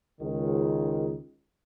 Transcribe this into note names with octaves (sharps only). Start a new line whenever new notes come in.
C#2 D#3